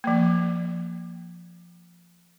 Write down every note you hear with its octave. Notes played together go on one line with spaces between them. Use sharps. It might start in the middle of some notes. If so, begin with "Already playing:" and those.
F3 A#3